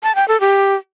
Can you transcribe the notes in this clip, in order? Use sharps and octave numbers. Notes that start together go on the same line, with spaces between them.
A5
G5
A4
G4